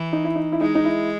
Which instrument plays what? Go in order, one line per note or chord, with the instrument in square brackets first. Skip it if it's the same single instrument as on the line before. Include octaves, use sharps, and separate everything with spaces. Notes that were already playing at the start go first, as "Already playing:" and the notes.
Already playing: [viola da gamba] E3
[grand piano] D#4
E4
D#4
E4
[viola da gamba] G#3 [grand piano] D#4
[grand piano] D#4
E4